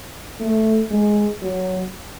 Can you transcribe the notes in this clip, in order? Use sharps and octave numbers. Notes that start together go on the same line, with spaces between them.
A3
G#3
F#3